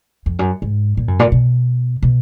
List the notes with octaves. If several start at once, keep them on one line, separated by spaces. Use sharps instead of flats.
F2
F#2
G#2
A#2
F#2
A#2
B2
B2